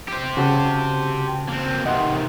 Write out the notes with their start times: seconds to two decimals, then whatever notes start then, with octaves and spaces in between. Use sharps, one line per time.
0.08 G4 C5
0.37 C#3 F#4 A5
1.48 A#3 C4
1.86 C3 D#3 D#5 F#5 C6